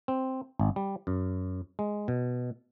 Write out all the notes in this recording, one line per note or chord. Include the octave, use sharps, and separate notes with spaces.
C4
G#1
G3
F#2
G#3
B2